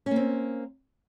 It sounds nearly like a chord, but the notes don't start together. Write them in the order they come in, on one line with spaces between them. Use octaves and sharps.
C#4 A#3 C4